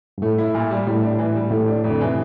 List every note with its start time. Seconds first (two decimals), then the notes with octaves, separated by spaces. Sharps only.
0.18 G2
0.22 A2 A3
0.38 E4
0.55 A#2
0.71 G3
0.87 A2 G3
1.03 D4
1.19 E3
1.35 G3
1.51 A2 A3
1.68 D4
1.84 F2
1.90 D3
2.01 C3 E3